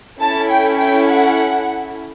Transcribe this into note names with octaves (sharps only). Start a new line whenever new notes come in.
C#4 E4 A4 A5
G5
G5
F#5